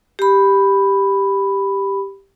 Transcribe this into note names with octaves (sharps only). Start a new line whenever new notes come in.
G4 B5